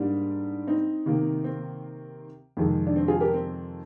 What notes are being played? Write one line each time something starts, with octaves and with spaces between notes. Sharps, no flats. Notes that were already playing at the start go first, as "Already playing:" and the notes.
Already playing: G#2 G3 A#3 D4
C4 D#4
C3 D#3 A#3
C4
F2 C3 D#3 G#3
D4
C4
F4 G#4
G4 A#4
C4